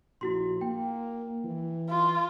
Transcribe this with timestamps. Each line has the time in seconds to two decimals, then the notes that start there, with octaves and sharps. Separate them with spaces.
0.21 A#1 E4 F#4 C6
0.61 A#3 G5
1.44 E3
1.89 F4